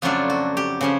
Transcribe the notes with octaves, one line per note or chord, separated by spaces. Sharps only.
F2 C#3 F#3 A3 D4 F4
F#4
G4
C#3 F3 C#4